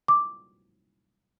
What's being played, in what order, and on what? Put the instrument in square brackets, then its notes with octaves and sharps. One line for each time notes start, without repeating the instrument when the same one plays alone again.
[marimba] D6